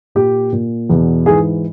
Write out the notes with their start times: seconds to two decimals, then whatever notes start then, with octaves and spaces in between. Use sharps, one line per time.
0.15 A#2 G4
0.53 A#2
0.90 E2 B2
1.26 G#2 E3 G#4